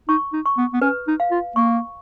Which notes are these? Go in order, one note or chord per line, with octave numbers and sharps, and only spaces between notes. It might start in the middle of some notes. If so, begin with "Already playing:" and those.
D#4 C#6
D#4
C#6
B3
B3
C#4 B4
D#4
F5
F4
A#3 C#6